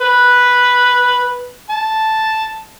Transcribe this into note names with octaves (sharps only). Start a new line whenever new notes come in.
B4
A5